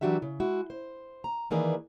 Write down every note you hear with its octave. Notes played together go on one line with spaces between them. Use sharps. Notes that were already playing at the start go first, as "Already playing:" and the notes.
E3 F#3 D4 F#4 G4 E5
C#3
G#3 E4 F#4
C5
A#5
D#3 E3 A#3 G#4 B4 D5